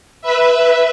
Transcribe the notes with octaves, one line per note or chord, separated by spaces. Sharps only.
B4 E5